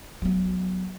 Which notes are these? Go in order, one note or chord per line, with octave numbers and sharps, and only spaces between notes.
F#3 B3